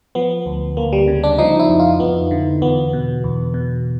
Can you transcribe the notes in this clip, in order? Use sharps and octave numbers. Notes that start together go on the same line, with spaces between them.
F3 B3
D2
D2 A#3
G3
C#3
D4
F3 D#4
E4
F2
F4
F2 B3
D3
E2 B3
B2
E2
B2